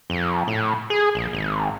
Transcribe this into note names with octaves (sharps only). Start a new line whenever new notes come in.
F2
A2
G#4
A#1
G#1